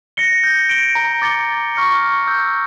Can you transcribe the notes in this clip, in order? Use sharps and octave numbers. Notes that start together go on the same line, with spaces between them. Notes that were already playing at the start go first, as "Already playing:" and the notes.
A#6 C#7 G7
G6
D7 G7
A#5
D6 A6 C#7 G7
A#5
C#6 F6 A#6 C#7
C#6
E6 G6